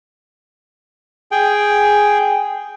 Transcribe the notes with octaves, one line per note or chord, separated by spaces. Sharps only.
G#4 G5